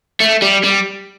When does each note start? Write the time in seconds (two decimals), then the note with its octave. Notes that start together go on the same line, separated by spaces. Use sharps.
0.21 A3
0.42 G3
0.63 G3